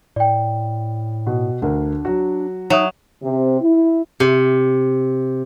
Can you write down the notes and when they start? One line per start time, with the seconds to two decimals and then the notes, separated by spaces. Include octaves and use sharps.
0.16 A2 D5 G5
1.27 B2
1.62 D2 D4 A#4
2.05 F#3 F#4
2.70 F#3 D#4 C#5 E5 D#6
3.22 C3
3.61 E4
4.20 C3